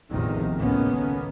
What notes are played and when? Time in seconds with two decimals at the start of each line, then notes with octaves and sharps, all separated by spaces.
0.10 A1 E2 C3 D#3 F3
0.56 C#2 A2 D#3 A#3 B3 C#4